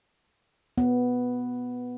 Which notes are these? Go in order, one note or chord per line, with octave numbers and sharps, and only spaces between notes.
B3